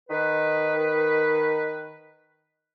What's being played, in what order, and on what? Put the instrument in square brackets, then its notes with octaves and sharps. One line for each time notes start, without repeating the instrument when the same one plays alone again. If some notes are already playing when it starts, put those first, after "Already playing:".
[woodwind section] D#3 B4